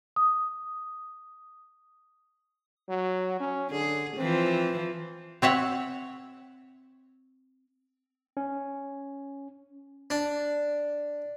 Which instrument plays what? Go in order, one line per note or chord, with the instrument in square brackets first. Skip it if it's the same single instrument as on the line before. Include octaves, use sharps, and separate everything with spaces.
[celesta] D#6
[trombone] F#3
C#4
[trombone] D3 [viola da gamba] G#4
[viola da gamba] E3 F3 [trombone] C4
[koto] C4 C#5 E5 F#5
[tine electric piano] C#4
[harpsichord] D4